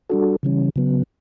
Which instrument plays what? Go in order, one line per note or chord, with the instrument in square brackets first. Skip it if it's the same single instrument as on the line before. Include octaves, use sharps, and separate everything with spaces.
[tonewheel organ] G3 D4 F#4 A4
C#3 E3 G3 C#4
C#3 F#3 B3